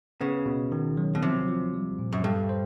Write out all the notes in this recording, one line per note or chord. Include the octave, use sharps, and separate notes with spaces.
C#3 B3
B2
D#3
F#3
B2
C3 F3
F3
G3
A#2
F#2
G2 A4
C5